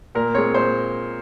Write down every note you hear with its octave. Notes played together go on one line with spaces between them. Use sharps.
A#2 A#4
G#3 C4 C#5
A#2 C5